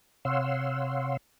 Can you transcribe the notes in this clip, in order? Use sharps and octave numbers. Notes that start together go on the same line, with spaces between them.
C3 C#5 F5 F#5 C6 E6